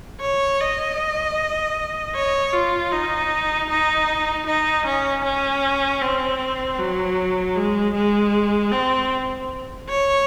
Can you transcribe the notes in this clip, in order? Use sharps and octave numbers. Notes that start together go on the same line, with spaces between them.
C#5
D#5
C#5
F4
D#4
D#4
D#4
C#4
C#4
C4
F#3
G#3
G#3
C4
C#5